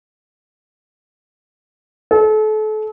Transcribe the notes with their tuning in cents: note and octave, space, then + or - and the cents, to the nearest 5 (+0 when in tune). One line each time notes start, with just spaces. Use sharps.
A4 -35